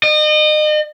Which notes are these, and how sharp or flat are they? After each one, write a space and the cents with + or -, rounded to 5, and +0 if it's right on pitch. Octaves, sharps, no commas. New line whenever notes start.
D#5 -35